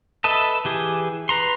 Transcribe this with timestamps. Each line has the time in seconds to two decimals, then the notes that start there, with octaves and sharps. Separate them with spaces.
0.24 A4 B4 D#5 E5 A5
0.65 E3 G4 G#4
1.29 B4 A#5 C6